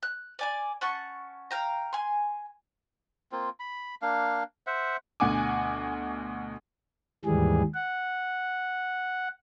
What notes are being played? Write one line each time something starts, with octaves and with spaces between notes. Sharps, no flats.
F#6
D5 G#5 D6
C#4 F#5 A5 C#6
F5 G5 A#5
G#5 C6
A#3 C4 F4
B5
A#3 D4 F5
C5 E5 F#5
D2 B2 F#5 G#5 D6
D#2 G#2 E3 G3 G#4
F#5